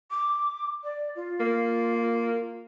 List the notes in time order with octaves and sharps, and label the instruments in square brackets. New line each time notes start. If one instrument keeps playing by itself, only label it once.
[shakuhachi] D6
D5
F4
[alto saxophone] A#3